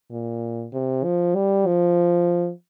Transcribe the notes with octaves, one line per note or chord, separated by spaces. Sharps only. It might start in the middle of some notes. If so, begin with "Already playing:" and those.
A#2
C3
F3
G3
F3